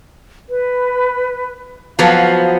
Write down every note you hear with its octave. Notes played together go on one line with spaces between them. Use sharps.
B4
F3 F#3 B3 F5